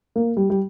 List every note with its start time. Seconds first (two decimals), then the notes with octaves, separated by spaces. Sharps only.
0.16 A#3
0.37 G3
0.50 G3